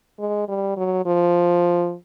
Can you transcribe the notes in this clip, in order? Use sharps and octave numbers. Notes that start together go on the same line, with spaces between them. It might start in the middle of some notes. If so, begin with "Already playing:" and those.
G#3
G3
F#3
F3